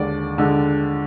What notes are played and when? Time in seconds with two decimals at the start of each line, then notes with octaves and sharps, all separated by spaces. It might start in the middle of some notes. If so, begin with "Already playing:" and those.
Already playing: D#2 D3 G#3 D5
0.38 D3 G#3